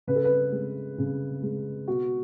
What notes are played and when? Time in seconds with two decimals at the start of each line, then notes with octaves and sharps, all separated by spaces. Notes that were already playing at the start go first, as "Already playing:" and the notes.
0.07 C#3 B4
0.16 A4
0.24 B4
0.52 G#3
0.98 C#3
1.43 G#3
1.87 B2 F#4